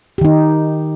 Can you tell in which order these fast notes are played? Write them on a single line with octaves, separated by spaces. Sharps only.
G4 D#3 D#4